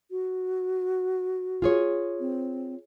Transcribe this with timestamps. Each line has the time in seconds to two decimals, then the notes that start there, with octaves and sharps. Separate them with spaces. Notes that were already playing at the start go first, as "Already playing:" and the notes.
0.11 F#4
1.62 F4 G#4 C#5
2.20 C4